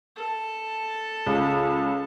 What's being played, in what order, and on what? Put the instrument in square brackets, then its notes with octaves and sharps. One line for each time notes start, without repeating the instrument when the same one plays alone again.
[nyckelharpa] A4 A5
[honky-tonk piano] C#2